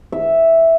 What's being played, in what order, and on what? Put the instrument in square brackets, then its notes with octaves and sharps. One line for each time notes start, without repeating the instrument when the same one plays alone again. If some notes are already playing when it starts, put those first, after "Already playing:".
[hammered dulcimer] E5